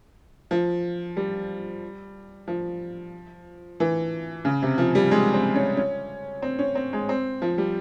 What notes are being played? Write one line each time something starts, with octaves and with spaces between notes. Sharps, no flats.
F3
G3
F3
E3
C#3
C3
F3
G3
G#3
C4
C#4
C#4
C4
C#4
C4
G#3
C4
F3
G3